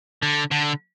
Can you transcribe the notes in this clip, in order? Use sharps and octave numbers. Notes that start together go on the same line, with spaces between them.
D3
D3